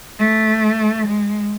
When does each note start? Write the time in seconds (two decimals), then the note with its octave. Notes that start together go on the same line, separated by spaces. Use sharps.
0.19 A3
1.08 G#3